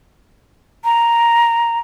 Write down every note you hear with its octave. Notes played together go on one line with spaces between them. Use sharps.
A#5